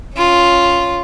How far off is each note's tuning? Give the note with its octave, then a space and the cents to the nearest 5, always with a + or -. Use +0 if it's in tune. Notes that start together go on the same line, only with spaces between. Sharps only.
C#4 +0 F4 +0